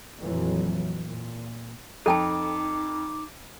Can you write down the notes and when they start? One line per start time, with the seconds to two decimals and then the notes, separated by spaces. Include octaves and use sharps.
0.22 F2 A#2 E3 F#3
1.03 A#2
2.06 F2 D#4 A4 G5 A5 D6